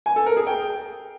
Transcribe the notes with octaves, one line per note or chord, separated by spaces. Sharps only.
G#5
A4
A#4
G#4
G5